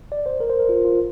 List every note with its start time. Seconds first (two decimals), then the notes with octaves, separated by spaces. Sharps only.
0.12 D5
0.26 C5
0.40 A#4
0.50 C5
0.59 A#4
0.69 F4
0.85 F4